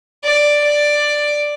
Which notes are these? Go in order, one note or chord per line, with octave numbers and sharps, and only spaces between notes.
D5
D5